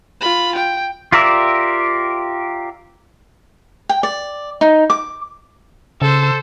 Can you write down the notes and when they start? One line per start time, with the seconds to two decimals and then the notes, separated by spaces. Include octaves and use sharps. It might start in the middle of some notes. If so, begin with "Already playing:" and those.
0.21 F4 B5
0.56 G5
1.12 F4 G4 A#4 D5 E5
3.89 G5
4.03 D5
4.61 D#4
4.90 D6
6.02 C#3 A4 C5